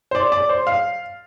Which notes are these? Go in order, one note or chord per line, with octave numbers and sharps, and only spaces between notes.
C5
D5
D5
C5
F5